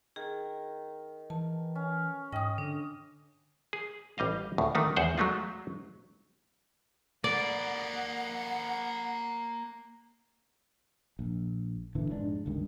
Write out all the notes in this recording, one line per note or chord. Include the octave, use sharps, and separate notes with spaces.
D#3 G#4
E3 A5
C#4
G#2 D#5 G5 D#6
D3 D4
G#4
A1 G3 D#5 F5
D2 A2
D3 D#3 A3 D#4
E2 G#4 C5 F#5
F#3 G#3 A3 D#4 F4
A#3 B4 D5 F#5
A#1
A#2 D3 E3
F1 G#2 G#3 D4
G1 C#2 G2 D#3